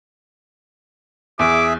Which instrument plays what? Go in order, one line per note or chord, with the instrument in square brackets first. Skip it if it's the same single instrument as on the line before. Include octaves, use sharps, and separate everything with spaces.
[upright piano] E2 [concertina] G#4 E5 [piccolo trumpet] D6